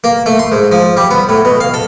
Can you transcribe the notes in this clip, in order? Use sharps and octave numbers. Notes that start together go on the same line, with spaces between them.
A#3
A3
C6
G#2
F3
G3
B3
A2
B2
F5
A4